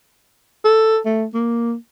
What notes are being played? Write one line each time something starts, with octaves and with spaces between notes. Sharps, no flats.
A4
A3
A#3